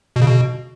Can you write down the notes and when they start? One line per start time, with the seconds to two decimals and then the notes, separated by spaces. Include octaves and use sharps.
0.16 B2
0.22 C#3
0.27 B2